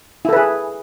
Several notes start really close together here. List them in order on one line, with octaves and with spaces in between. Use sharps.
E4 A4 B4 G#4